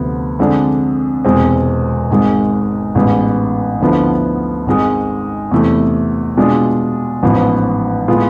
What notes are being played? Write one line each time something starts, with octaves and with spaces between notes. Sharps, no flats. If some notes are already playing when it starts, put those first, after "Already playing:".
Already playing: D2 C3 F3 B3
F2 D3 G#3 D4
E1 E2 C3 G#3 C4
G#1 G#2 G#3
A1 G#2 G#3 B3
D2 D3 F3 B3 E4
G#1 G#2 G#3
E2 C3 E3 A3
B2 G#3 D4 F4
A1 G#2 F3 B3
A2 G#3 B3 F4